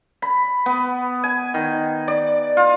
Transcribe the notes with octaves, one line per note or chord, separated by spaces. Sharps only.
B5
B3
G#5
D#3
D5
F4